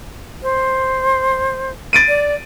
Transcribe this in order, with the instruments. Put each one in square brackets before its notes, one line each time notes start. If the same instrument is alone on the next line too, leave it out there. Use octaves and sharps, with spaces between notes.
[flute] C5
[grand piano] A6 D7 D#7
[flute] D5